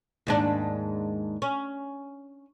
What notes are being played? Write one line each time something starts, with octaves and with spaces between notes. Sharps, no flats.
D#2 G#2 D4
C#4